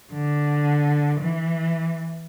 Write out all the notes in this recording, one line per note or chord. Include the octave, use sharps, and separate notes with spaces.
D3
E3